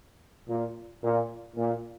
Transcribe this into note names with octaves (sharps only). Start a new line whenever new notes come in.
A#2
A#2
A#2